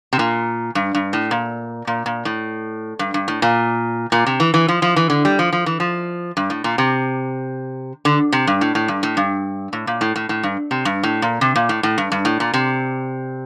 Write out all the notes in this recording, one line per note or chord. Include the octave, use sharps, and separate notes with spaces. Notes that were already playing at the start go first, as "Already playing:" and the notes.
C3
A#2
G2
G2
A2
A#2
A#2
A#2
A2
G2
G2
A2
A#2
A#2
C3
E3
E3
F3
F3
E3
D3
G3
F3
F3
E3
F3
G2
A2
A#2
C3
D3
C3
G2
A2
A2
G2
A2
G2
A2
A#2
A2
A2
A2
G2
C3
G2
A2
A#2
C3
A#2
A2
A2
G2
G2
A2
A#2
C3